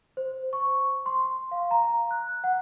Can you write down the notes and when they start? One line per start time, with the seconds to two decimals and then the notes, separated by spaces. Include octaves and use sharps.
0.17 C5
0.53 C#6
1.06 C6
1.51 F5
1.71 A#5
2.11 F#6
2.44 F#5